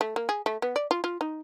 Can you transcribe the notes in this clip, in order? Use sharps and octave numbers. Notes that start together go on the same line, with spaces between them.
A3
A#3
G#4
A3
B3
D5
F4
F4
D#4